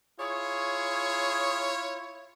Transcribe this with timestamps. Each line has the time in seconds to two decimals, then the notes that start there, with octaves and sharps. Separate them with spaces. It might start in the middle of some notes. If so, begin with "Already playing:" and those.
0.20 E4 F4 G#4 C#5